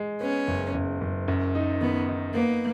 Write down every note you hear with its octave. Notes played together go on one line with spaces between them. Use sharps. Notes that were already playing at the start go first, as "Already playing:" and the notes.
Already playing: G#3
B3 C#4
F#1
F#1
F#1
F#2
D#4
D#3 B3
D#4
A#3 B3